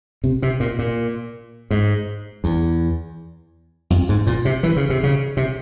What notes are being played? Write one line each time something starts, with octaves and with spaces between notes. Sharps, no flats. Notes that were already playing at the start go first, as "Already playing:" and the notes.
C3
C3
A#2
A#2
G#2
E2
F2
G#2
A#2
C3
E3
C#3
C3
C#3
C3